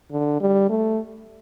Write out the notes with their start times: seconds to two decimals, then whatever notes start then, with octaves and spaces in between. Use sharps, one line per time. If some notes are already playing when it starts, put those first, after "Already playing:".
0.12 D3
0.40 G3
0.69 A3